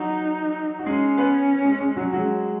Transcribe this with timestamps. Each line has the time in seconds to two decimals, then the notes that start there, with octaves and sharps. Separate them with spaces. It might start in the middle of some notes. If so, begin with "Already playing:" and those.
Already playing: F#3 D#4 F#4
0.79 F#4
0.86 G#3 C#4 G#4
1.17 B3 B4
1.65 G#3 G#4
1.81 G#3 G#4
1.96 F#3 F#4
2.13 F#3 G#3 F#4